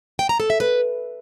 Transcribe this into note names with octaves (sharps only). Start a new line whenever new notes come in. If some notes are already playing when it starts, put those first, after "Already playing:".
G5
A#5
A4
E5
B4